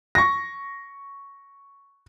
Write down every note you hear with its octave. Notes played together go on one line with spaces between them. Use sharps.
C#6 A#6